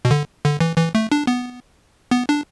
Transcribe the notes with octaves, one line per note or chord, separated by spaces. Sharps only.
B2
D3
D3
E3
E3
A3
D4
B3
B3
D4